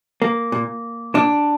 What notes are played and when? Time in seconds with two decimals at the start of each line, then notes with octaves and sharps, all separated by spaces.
0.22 A#3
0.52 A#2
1.14 A#2 D4